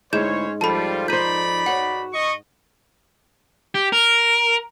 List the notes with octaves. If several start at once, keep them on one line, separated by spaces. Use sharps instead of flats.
D2 G#2 C#4 E4 C5 C#5 G6 E7
F2 F3 G3 F4 A4 A5 B5
D#4 A#4 C5 D5 B5 G6 D#7
F#4 C#5 F#5 F#7
D#5 C#6
G4
A#4